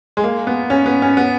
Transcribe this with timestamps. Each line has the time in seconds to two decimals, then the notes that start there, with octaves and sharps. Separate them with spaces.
0.17 G#3
0.24 A#3
0.47 B3
0.70 C#4
0.86 B3
1.02 C#4
1.17 B3